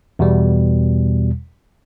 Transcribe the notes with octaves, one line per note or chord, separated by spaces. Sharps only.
E2 B2 G3